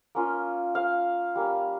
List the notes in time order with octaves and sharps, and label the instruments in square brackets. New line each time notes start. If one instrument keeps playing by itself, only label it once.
[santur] A#3 C#4 F4
F5
G3 A#3 C#4